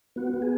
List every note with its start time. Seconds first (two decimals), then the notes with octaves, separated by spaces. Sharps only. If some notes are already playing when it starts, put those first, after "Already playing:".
0.16 B3 F#4
0.34 B3
0.42 G#4